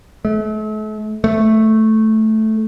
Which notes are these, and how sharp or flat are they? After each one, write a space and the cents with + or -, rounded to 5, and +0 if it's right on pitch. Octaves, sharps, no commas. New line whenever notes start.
A3 -40
A3 -5